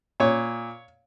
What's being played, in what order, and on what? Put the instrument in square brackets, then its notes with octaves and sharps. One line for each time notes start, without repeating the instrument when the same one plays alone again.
[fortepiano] A#2 C#5